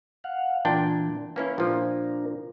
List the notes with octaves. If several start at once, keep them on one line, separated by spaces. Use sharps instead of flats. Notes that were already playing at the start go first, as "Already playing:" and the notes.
F5 F#5
A#2 E3 D4 G5
A#3 C#4 E4 B4
A#2 F3 D4 A#4